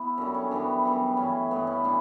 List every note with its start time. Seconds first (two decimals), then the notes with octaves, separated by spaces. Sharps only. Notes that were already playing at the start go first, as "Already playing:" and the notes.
Already playing: B3 E4
0.17 F#2 D3 G3 C#4
0.34 C#4
0.51 F#2 E3 G3 B3 D4
0.84 F#2 E3 G3 B3
1.17 G2 E3 A3 C#4
1.51 G2 E3 A3 B3
1.67 C#4
1.84 A2 E3 D4